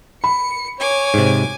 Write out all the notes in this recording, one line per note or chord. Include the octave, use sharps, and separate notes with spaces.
B5 C#7
C#5 G#5 D6
G#2 C3